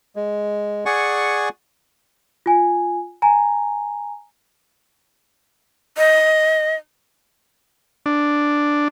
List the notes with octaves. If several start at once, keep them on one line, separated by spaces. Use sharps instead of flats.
G#3
G#4 D5 F#5 G#5 C#6
F4 G#5
G#5 A#5
D#5
D4